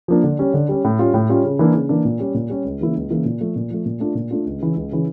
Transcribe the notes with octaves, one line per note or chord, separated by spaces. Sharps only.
F3 A#3 D4
D3
G3 C#4
D3
G3 C#4
A2
G3 C#4 F4
A2
G3 C#4 F4
C#3
E3 A#3 D4
C#3
E3 A#3 D4
A#2
G3 C#4 G4
A#2
G3 C#4 G4
C#2
C#3 E3 A#3 E4
C#2
C#3 E3 A#3 E4
A#2
F3 A3
A#2
F3 A3
A#2
A3 D4 F4
A#2
A3 D4 F4
C#2
C#3 E3
C#2
C#3 E3